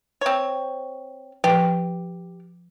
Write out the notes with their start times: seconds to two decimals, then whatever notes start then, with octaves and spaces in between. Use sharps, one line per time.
0.21 C4 C#5
1.44 F3 G4